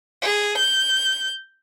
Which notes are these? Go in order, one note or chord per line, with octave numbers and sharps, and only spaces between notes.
G#4
G6